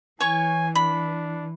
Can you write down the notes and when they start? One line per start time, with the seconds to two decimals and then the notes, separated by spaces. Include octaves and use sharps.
0.20 E3 C#5 G#5 C#6
0.75 D4 B5